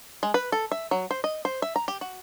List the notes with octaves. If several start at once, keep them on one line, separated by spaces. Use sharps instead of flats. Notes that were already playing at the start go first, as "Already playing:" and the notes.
G#3
B4
A4
E5
F#3
C5
D#5
C5
E5
A#5
G4
F#4